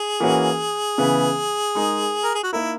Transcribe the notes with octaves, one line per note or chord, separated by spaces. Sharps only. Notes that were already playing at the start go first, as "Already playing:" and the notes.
Already playing: G#4
E3 A#3 C#4 F#4
C#3 E3 B3
G#3 D#4 A#4
A#4
G#4
F#4
A#3 D#4 E4 A#4